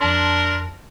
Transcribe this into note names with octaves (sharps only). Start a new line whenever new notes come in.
F2 D4 A#4 A5 C6